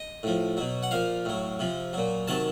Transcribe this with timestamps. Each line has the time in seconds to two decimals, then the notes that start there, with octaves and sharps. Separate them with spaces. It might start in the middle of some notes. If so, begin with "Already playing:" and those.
Already playing: D#5
0.23 A2 F3
0.57 B2 F#3
0.83 F#5
0.91 A#2 F3 F5
1.25 A2 F#3
1.59 C3 F3
1.93 A#2 F#3
2.28 C3 D#3 F#3 A5